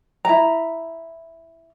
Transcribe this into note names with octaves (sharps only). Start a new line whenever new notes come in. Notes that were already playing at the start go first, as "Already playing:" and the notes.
E4 A#5